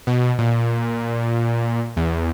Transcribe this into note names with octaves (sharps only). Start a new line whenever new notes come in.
B2
A#2
E2